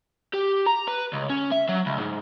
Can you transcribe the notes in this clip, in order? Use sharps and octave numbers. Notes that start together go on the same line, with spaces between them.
G4
A#5
B4
C#2
C#4
E5
F#3
C#2
G#2